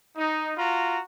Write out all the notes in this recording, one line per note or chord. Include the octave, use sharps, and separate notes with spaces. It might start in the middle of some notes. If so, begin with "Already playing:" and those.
D#4
F4 F#4 A#5